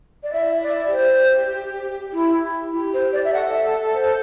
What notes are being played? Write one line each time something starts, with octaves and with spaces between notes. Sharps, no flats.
D5
E4 E5
D5
G4 C5
E4
E4 G4
C5
D5
E5
A4 F#5
E5
C5